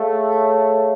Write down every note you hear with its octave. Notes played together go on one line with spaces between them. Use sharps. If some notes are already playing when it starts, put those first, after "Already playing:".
Already playing: A3 G#4 C#5 F5
C#5